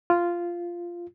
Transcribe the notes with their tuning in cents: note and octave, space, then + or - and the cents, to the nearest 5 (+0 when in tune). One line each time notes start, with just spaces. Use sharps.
F4 -10